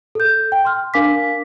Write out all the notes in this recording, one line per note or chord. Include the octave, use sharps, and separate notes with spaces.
A4 G6
G5
C6 F6
D4 A#4 F5 G#5 D6 B6